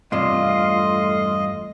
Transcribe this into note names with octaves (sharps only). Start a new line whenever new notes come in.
E2 G2 C3 A3 F4 D#5